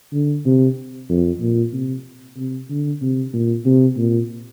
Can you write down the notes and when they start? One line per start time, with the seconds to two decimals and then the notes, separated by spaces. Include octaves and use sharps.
0.13 D3
0.46 C3
1.09 F2
1.41 A#2
1.73 C3
2.37 C3
2.70 D3
3.02 C3
3.33 A#2
3.66 C3
3.97 A#2